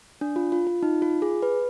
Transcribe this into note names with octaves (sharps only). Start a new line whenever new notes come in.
D4
F4
F4
F4
D#4
F4
G#4
B4